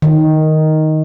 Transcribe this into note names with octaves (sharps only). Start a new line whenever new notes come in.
D#3